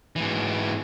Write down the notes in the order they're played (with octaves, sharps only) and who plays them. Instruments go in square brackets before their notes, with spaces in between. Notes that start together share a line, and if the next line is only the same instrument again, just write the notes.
[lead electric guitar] G#2 E3